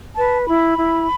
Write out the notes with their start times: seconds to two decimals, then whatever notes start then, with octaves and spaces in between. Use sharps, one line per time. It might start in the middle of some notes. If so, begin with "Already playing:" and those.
0.16 B4 A5
0.47 E4 B5
0.78 E4